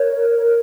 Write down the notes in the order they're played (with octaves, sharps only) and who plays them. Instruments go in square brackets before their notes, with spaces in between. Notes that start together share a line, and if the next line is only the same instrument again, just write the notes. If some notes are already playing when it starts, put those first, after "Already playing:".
Already playing: [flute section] A#4 C#5